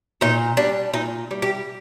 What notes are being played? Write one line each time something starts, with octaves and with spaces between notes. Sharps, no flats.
A#2 D#4
G3 D4
A#2 D#4
G3
G4